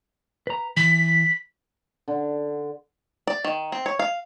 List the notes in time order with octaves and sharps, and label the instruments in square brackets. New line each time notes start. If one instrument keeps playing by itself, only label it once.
[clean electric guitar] B4 A#5
[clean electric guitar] E3 [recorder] B6
[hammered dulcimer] D3
[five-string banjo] D5
D#3
C4
C#5
F5